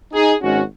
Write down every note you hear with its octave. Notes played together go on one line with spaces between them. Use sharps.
D#4 G#4
G#1 G#2 G#3 C#4 F#4